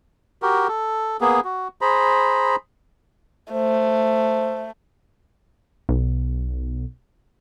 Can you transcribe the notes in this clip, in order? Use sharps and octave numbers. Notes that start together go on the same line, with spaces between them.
F#4 G4 A#4
A4
A#3 B3 G#4
F#4
G#4 C5 A#5 B5
A3 C5
B1